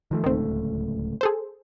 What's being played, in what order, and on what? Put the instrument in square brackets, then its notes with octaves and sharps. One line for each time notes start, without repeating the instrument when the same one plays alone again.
[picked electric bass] D#3 F3 A3
[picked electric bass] D1 C#2 A3 [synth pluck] D#3 C4
[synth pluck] G#4 A4 C5